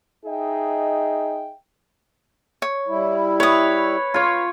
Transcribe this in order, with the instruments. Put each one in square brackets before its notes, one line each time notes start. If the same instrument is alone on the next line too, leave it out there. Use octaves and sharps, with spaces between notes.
[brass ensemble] D#4 G#4 D#5 E5 G5
[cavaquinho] C#5
[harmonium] G3 E4
[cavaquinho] B4 D#6 [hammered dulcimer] C#5
[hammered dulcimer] F4 C#5